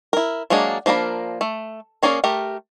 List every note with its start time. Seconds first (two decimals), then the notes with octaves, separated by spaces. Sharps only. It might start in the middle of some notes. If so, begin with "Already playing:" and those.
0.13 E4 A#4
0.50 F#3 G#3 A#3 D4 G#4
0.86 F3 A#3 D4 A#4 B5
1.41 A3
2.03 A#3 C#4 G#4 A#4 D5
2.24 A3 G4 A#4